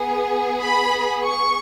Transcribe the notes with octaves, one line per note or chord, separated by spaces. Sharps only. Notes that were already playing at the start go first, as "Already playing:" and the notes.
Already playing: B3 G#4
B5
C#6